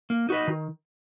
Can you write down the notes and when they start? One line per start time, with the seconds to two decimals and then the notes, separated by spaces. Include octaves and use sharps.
0.10 A#3
0.29 D#4 F#4 B4 D#5
0.47 D#3